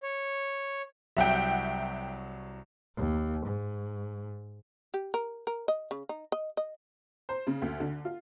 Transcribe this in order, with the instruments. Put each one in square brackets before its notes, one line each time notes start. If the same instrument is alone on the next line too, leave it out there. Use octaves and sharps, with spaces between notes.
[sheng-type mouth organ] C#5
[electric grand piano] C2 F#3 [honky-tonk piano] E5 F#5 G5
[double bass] D#2
G#2
[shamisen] G4
A#4
A#4
D#5
C#3
D#4
D#5
D#5
[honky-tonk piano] C5
C#3
D2
D3
F4